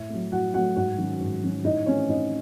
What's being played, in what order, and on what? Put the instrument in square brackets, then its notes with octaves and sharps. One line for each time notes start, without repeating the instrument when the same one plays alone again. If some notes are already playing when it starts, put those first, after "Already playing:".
Already playing: [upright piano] A2 E5
F#3 A3
A2 F#4 F#5
F#3 A3 F#4 F#5
G#2 F#4 F#5
D#3 F#3 C#4
G#2
D#3 F#3 C#4
A2 D#4 D#5
E3 A3 C4 C#4 D#4 C#5
A2 D#4 D#5